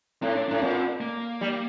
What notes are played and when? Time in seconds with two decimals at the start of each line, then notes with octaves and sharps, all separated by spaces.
0.22 A2 C4
0.35 D4
0.48 A2 D4
0.61 A#2 C4
1.01 A#3
1.41 G3